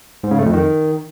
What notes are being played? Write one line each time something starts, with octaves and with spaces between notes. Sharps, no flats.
G#2
C#3
A3
F2
D#3